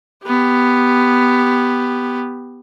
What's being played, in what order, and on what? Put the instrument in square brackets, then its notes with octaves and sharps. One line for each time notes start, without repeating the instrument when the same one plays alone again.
[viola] B3 G4